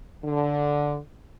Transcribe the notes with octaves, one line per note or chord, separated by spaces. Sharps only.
D3